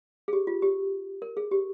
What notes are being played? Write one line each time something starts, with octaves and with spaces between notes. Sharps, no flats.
G#4
G4
F4
G4
A#4
G#4
G4